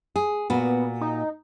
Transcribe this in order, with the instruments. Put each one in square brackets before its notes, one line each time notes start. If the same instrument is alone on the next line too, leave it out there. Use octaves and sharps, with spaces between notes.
[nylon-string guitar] G#4
[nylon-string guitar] A#2 F#4 [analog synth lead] B3
[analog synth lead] D#4